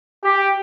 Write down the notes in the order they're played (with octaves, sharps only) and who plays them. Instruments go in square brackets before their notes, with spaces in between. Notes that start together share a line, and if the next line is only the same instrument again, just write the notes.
[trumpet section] G4